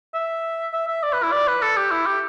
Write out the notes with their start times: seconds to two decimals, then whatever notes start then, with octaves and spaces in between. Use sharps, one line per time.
0.14 E5
0.73 E5
0.88 E5
1.03 D5
1.13 B4
1.23 E4
1.32 D5
1.48 B4
1.62 A4
1.77 G4
1.91 E4
2.06 G4